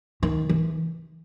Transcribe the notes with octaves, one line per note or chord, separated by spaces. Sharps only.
D#3
E3